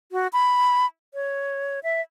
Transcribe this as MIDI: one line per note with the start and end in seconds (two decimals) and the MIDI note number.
0.12 0.28 66
0.33 0.86 83
1.14 1.80 73
1.83 2.01 76